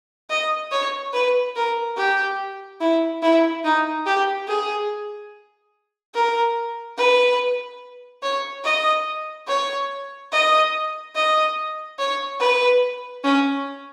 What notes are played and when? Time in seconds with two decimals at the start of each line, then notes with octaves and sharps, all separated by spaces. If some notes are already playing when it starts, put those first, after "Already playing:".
0.30 D#5
0.72 C#5
1.13 B4
1.56 A#4
1.97 G4
2.81 E4
3.22 E4
3.64 D#4
4.06 G4
4.48 G#4
6.15 A#4
6.98 B4
8.23 C#5
8.65 D#5
9.48 C#5
10.32 D#5
11.15 D#5
11.99 C#5
12.40 B4
13.24 C#4